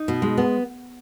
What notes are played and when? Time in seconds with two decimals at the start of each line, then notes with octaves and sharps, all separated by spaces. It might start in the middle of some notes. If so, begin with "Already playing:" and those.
Already playing: D#4
0.08 B2
0.22 G#3
0.38 B3